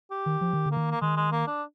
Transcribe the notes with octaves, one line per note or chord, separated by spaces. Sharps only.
G4
D#3
F3
D#3
D3
A#3
D#3
A#3
D#3 G#3
G#3
A#3
D4